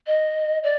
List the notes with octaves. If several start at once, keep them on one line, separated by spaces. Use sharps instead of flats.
D#5
D5